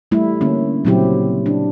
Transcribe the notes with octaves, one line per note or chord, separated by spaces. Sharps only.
G3 A3 E4
D3 A#3 C#4
A#2 C#3 F#3 C4 E4 G4
D4